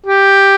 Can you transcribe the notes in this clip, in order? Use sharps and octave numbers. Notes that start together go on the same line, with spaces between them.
G4